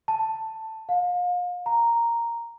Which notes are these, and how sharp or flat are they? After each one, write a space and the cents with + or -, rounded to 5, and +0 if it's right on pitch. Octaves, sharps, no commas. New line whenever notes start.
A5 +10
F5 +35
A#5 -5